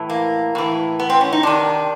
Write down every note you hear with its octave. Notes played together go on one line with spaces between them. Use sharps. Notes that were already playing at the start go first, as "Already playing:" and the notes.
Already playing: A2 E3
A#3
A2 E3
B3
C4
C#4
D#4
C3 D#3 D4